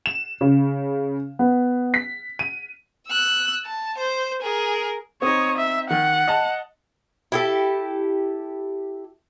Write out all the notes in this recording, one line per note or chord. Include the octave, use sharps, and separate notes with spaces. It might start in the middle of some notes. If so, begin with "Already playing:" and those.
E7
C#3
B3
B6
D#7
E6 F#6
A5
C5
G#4 A#4
C4 D#4 C#5 D#6
E5
D#3 F#5
D#5 A5
E4 G4 A4